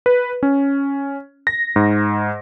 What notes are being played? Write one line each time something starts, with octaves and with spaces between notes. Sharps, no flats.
B4
C#4
A#6
G#2